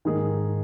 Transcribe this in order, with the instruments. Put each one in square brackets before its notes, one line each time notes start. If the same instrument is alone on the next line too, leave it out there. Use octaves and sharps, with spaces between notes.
[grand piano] G#2 D#3 A#3 D#4 G#4